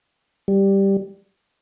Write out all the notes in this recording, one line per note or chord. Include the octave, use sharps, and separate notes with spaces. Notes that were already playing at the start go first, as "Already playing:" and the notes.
G3